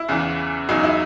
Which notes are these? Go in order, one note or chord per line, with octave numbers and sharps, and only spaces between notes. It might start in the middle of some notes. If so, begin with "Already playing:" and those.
Already playing: E4
E2 C#3 E3
E2 C#3 F#3 D#4
E4